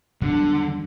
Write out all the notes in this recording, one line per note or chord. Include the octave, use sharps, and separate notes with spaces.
E2 G2 D3 F#3